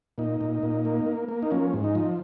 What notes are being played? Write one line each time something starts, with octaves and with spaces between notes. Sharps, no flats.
A#2 D#4
A#2
A#2
A#3
A#3
A#3
D#4
F3 C#4
G#2
D#4
F3